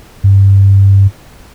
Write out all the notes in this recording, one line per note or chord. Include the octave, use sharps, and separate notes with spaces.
G2